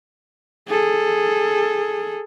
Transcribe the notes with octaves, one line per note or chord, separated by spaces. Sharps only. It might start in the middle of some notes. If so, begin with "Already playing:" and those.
G#4 A4